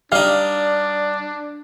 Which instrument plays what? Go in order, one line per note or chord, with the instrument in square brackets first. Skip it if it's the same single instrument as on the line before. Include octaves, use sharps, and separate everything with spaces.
[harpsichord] G3 D#4 [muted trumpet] D4 [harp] F5